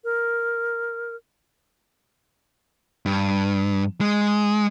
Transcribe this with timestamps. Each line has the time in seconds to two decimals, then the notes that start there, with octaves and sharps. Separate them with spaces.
0.04 A#4
3.06 G2
4.01 G#3